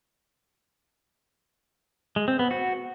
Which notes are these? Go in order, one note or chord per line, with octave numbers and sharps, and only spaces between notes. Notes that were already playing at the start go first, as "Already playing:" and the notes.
G#3
C4
B3
F#4